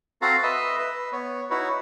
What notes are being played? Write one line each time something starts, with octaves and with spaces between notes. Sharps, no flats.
C4 F#4 A4 F5 A#5
B4 D#5 E5
B4
B3 C#5
D#4 E4 F#4 B4 C#5